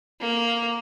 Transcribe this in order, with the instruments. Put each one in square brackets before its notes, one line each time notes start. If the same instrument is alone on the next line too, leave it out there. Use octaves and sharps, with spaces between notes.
[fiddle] A#3